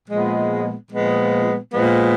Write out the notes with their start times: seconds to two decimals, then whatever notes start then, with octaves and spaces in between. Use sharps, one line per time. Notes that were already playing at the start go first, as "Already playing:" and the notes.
0.08 A#2 F3 G#3 B3
0.91 A#2 F3 G#3 B3
1.74 A#2 F3 G#3 B3